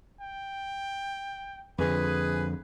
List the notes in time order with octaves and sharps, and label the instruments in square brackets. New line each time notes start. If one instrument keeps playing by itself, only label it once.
[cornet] G5
[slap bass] F2 D3 [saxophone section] G#4 B4